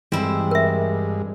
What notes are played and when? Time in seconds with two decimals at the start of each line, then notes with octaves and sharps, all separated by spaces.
0.12 G2 E3 G#3 C4 E4
0.51 A#4 E5